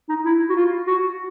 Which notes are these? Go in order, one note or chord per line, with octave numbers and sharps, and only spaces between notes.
D#4
E4
F#4
F4
F#4